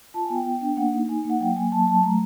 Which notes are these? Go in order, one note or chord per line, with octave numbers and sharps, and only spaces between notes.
F4 A5
G#5
B3 G5
B3
D4
A#3 F#5
D#4
D#4 G#5
A#3
F#5
F#3 G5
A#3 G#5
F#3 A5
F#3 A5
A3 A#5